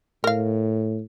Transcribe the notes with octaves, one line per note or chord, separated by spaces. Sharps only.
A2 A#4 F5